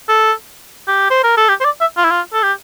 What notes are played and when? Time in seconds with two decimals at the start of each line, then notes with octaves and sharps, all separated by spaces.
0.09 A4
0.88 G4
1.11 C5
1.24 A#4
1.37 A4
1.49 G4
1.61 C5
1.65 D5
1.81 E5
1.97 F4
2.04 E4
2.11 F4
2.33 A4
2.43 G4